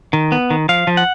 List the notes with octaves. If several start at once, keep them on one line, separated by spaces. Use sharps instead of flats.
D#3
B3
D#3
F3 F5
F3
F#5